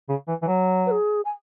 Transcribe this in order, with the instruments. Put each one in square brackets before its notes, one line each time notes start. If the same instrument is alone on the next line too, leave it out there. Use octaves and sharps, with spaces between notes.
[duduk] C#3
E3
E3
F#3
[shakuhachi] B4
G#4
G#5